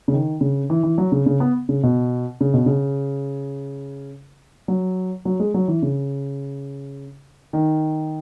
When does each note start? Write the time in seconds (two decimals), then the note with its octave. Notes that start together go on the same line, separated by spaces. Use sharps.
0.08 C#3
0.13 D#3
0.41 C#3
0.70 E3
0.84 E3
0.98 F#3
1.12 C#3
1.26 C#3
1.40 B3
1.69 C#3
1.83 B2
2.41 C#3
2.54 B2
2.66 C#3
4.68 F#3
5.25 F#3
5.40 G#3
5.54 F#3
5.68 E3
5.82 C#3
7.53 D#3